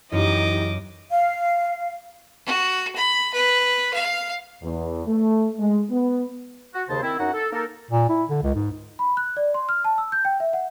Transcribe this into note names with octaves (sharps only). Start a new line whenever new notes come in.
F#2 E3 D#4 G4 D#5 D6
F5
F#4
B5
B4
F5
E2
A3
G#3
B3
F#4
D#2 C#3 C5 A5
D#3 C4 E4
F#2 D#4 F#4 F#5
A4
A#3 D#4 A4 A#4
A#2
E4
D3
C#2
G#2
B5
F#6
D5
C6
F6
A5
E6
G6
G5
E5
F#5